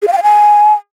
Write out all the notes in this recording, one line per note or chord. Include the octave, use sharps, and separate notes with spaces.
G#4
F5
G5
F5
G#5